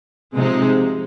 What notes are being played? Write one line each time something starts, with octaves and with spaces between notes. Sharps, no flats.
C3 F3 G#3 C4 D#4